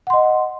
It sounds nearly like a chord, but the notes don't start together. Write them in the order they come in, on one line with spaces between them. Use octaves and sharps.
F#5 C6 D#5